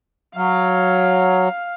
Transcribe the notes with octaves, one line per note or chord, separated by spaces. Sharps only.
F#3 F5